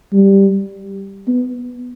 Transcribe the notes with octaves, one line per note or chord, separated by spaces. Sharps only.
G3
B3